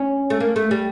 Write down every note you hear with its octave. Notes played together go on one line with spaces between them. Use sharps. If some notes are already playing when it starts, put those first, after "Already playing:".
Already playing: C#4
A3
A#3
A3
G3